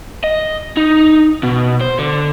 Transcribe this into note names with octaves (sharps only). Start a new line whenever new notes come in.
D#5
D#4
B2
C5
D3